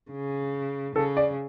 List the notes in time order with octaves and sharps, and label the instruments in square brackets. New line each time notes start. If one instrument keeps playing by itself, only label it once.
[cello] C#3
[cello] C#3 [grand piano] A4
[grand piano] D5